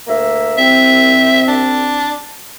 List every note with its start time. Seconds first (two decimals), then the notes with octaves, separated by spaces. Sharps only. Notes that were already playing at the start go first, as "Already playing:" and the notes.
0.08 D2 A#3 E5
0.58 C2 C4 E5
1.48 D4